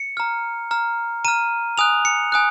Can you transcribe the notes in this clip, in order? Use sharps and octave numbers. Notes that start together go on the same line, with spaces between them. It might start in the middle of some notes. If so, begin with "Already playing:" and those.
Already playing: C#7
A#5 F6
A#5 F6
A#5 F6 D#7
G#5 D#6 F#6 F7
C#7
G#5 D#6 F#6